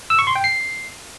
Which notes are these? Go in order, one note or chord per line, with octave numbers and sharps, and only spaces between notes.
E6
C#6
C6
G5
C7